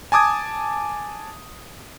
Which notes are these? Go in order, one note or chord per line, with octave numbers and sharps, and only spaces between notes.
G#5 A5 D6 D#6 G#6